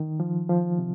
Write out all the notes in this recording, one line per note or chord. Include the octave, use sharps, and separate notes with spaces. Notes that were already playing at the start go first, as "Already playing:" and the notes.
Already playing: D#3
F3
F3
C3